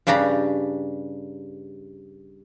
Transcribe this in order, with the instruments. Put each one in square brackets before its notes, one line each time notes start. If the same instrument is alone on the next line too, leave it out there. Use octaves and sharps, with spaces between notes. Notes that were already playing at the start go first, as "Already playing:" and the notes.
[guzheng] G2 C#3 D4 G4 A#5 B5